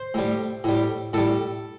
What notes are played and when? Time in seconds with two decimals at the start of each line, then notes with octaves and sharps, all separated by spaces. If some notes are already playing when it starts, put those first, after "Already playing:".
Already playing: C5
0.14 A2 G3
0.64 A2 G3
1.13 A2 G3 A4